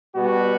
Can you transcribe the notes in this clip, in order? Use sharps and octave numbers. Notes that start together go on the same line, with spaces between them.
B2 G3 B3 F#4